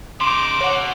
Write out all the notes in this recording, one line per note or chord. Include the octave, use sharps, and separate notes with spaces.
C#3 D#4 C6 D6
B2 C#5 F#5